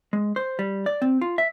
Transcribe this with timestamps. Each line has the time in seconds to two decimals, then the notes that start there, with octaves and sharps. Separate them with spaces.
0.13 G#3
0.36 C5
0.59 G3
0.86 D5
1.02 C4
1.21 F4
1.38 E5